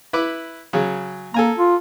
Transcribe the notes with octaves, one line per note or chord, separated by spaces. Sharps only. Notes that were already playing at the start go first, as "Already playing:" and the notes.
E4 B4 D6
C#3 F#3
A#3 A4 G#5 A#5
F4